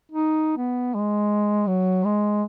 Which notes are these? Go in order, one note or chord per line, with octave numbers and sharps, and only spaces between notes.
D#4
B3
G#3
F#3
G#3